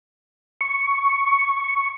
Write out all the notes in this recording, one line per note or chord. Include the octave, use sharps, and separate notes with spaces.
C#6